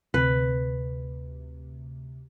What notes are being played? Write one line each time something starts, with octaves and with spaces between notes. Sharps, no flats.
D2 C3 B4